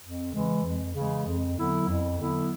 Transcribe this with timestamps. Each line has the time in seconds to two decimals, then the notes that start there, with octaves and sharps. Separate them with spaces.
0.02 F2
0.32 C#3 E3 G#3
0.64 F2
0.95 C#3 E3 G#3
1.26 F2
1.57 D3 F#3 B3 E4
1.88 F2
2.19 D3 F#3 B3 E4